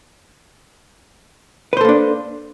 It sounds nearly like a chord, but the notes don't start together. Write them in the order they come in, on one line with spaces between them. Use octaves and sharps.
B4 C5 A4 A#3 D4